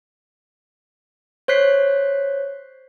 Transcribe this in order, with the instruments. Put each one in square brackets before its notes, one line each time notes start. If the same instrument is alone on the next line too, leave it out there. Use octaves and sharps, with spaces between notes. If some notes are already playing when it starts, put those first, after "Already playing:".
[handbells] C5 C#5 F#6 B6 C7